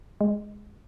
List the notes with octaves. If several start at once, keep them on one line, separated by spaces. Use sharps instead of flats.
G#3